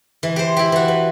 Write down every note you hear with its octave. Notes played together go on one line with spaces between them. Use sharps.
E3
G4 C5
E4 G4
E3 F#4
B4